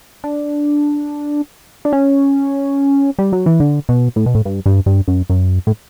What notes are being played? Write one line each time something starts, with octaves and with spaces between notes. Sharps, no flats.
D4
D4
C#4
G3
F#3
E3
D3
B2
A2
B2
A2
G2
G2
G2
F#2
F#2
A2